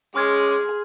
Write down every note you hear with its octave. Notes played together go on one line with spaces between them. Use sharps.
G#3 C#4 G#4 C6 D6 F6 G#6